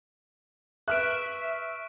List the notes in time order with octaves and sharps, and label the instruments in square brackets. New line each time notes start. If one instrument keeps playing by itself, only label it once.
[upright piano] B4 F6 F#6 [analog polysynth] E5 [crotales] C#6 D7